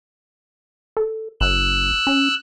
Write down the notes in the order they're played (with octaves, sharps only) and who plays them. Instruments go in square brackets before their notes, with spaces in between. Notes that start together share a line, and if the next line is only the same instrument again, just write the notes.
[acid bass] A4
[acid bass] F#1 [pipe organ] E6 F#6
[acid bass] C#4